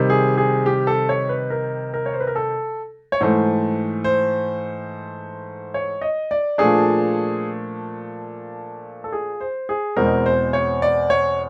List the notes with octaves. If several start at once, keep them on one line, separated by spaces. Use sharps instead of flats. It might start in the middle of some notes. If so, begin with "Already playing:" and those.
Already playing: C3 D#3 G3
G#4
G#4
G4
A4
C#5
B4
A#4
A#4
C#5
C5
B4
A#4
A4
C#5
G#2 E3 A3 C5
C5
C#5
D#5
D5
A#2 F3 A3 D4 G#4
A4
G#4
C5
G#4
E2 B2 G#3 C4 A#4
C5
C#5
D5
C#5